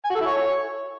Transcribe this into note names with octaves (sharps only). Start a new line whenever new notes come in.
G#5
F#4
A4
E4
C#5